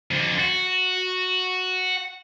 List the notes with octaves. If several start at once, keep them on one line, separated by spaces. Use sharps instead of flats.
F2 D3
F#4